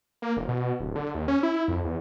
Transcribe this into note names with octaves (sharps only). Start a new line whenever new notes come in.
A#3
E1
B2
D1
D3
D#2
C#4
E4
F2
E2